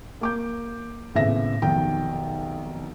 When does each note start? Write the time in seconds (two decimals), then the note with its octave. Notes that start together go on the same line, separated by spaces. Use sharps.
0.21 A#3 D6 G6
1.15 G#1 A2 C#3 B3 E5 A#6
1.62 F1 B1 D#3 G5